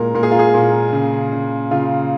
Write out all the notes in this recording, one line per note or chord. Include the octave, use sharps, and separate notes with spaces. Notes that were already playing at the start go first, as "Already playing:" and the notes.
Already playing: A#2 G#3 A#4
A#2 A#4
G#4
F4
G#4
A#2
C#3
C#3
C#3 F4